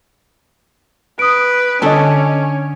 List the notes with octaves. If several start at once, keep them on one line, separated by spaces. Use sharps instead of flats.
B4 D#6 D7
D3 C#4 D4 A4 D5 D#5